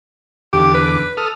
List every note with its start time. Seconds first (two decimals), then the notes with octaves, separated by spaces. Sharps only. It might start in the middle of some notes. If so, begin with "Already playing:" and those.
0.53 E2 D3 G4 D6
0.74 B4
1.17 A4 D#6 F6